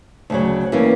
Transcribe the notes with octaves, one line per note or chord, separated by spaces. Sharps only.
D2 C#3 F#3
E3 G3 A#3 C#4